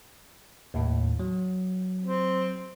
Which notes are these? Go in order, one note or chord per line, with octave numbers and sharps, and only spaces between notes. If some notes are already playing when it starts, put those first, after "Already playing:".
D#2 A2
F#3
C4